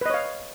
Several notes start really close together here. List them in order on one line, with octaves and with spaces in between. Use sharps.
B4 D#5 C#5 F5